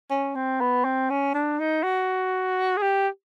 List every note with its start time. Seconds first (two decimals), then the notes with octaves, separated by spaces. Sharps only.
0.10 C#4
0.35 C4
0.60 B3
0.84 C4
1.10 C#4
1.34 D4
1.59 D#4
1.83 F#4
2.77 G#4
2.82 G4